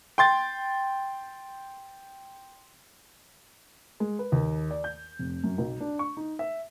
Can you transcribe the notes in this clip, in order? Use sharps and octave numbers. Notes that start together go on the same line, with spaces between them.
G5 C6 A6
G#3
B4
D#2
D5
G6
F1
F#2
B1
D4
C#6
D#4
E5